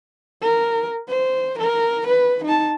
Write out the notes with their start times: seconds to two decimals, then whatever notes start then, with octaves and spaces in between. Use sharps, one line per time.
0.42 A#4
1.08 C5
1.58 A#4
2.07 B4
2.44 D#4 A5